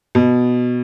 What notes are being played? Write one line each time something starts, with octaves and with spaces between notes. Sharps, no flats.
B2